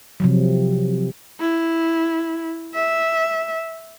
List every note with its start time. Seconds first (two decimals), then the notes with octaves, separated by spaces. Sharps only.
0.20 C3 F3 F#3
1.40 E4
2.74 E5